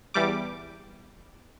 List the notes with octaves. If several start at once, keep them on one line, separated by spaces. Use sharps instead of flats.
E2 G3 D6